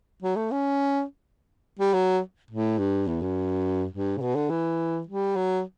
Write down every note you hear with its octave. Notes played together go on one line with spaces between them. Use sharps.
F#3
A3
C#4
G3
F#3
A2
G2
E2
F#2
G2
C#3
B2
D3
E3
G3
F#3